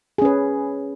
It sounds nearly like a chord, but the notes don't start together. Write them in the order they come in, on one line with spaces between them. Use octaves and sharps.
G#4 C#4 B4